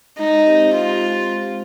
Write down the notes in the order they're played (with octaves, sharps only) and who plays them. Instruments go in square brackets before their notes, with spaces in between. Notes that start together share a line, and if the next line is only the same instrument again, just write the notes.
[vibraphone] G#3 [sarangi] D#4
[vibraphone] C4 G4 C5
[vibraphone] G#3 [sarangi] F4